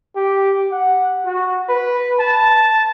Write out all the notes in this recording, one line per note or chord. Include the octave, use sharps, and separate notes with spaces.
G4
F#5
F#4
B4
A5